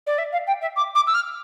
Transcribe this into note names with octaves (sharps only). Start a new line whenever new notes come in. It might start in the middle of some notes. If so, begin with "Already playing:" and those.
D5
E5
F5
G5
E5
D6
D6
E6
F6